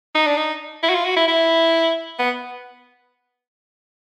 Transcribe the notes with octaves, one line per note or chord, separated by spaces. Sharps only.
D#4
D4
D#4
E4
F#4
F4
F#4
E4
E4
B3